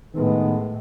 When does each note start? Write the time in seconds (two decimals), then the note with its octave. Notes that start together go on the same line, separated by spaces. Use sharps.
0.14 A2 D#3 G#3 B3